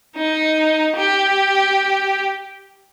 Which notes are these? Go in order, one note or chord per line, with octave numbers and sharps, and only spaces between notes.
D#4
G4